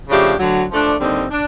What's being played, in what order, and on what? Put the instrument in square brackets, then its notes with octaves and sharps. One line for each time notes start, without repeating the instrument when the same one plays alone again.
[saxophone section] C#3 F3 A3 D4 G4
D2 D3 F#3
F3 A3 D4
D#2 D3 G3 C4 D#4
D4